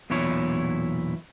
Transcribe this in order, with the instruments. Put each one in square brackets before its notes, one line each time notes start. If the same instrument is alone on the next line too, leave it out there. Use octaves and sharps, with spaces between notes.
[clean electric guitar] B1 E2 A#2 E4 C#5